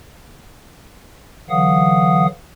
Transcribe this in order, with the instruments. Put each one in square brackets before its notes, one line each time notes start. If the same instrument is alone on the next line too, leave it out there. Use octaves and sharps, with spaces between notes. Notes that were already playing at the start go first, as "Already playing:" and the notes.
[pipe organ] D3 E3 F#3 F5 F#5 D#6